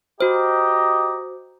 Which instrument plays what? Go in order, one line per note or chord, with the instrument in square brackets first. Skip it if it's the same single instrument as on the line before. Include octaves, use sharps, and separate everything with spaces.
[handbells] F#4 C5 [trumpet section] G4 D#5 A#5